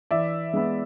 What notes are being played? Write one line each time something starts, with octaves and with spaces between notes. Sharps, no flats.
E3 D5 E5
G#3 B3